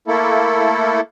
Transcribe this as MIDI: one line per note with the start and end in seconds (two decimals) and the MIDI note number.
0.08 1.01 57
0.08 1.01 58
0.08 1.01 64
0.08 1.01 69